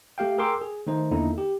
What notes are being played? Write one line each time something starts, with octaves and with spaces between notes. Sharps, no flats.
A3 G4 F5 G5
G#4 A#4 G5 C6 D6 E6
G#4
D#3 A3 D#4 C5
E2 D3 A#3 D#4 E4
G4